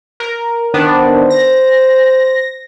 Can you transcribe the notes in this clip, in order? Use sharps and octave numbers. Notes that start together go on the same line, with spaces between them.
A#4
D#3 B3 D4 C5
A#6